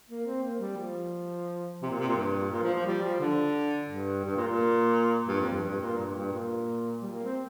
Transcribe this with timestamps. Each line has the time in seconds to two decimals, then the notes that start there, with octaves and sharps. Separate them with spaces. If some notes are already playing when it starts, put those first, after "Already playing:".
0.09 A#3
0.26 C4
0.43 A#3
0.60 G3
0.77 F3
1.82 C3
1.90 A#2
1.99 C3
2.08 A#2
2.16 G2
2.51 A#2
2.63 F3
2.74 F3
2.86 G3
3.03 F3
3.20 D3
3.89 G2
4.24 G2
4.36 A#2
4.47 A#2
5.28 G2
5.40 F2
5.51 G2
5.63 G2
5.80 A#2
5.97 G2
6.15 G2
6.32 A#2
7.02 G3
7.12 A#3
7.24 C4